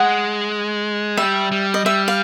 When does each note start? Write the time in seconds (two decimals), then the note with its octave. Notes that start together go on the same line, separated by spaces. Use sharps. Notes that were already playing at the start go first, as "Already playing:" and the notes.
Already playing: G#3 F#5
1.17 G3 E5
1.52 G3
1.74 D#5
1.85 G3 E5
2.08 F5